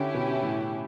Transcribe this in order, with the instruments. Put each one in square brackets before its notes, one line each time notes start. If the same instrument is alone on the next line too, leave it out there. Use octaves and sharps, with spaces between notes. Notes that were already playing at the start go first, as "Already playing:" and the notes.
Already playing: [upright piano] D3 [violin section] C#4 E4 G4
[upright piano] B2
A2